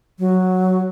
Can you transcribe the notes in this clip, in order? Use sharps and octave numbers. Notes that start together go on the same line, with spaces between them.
F#3